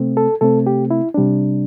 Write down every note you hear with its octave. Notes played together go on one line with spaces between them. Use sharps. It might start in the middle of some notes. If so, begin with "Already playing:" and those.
Already playing: C3 A3 C4
A4
C3 A3 C4 A4
G4
E4
C3 G3 D4